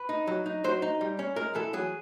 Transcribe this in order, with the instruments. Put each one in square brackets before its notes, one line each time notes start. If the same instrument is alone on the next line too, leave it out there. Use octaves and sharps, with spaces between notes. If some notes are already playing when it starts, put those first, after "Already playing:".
Already playing: [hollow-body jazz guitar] B4
D#4
F#3
D#4
F#3 C5
D#4
G3
C#4
G#3 A#4
E3 A4
F#3 G#4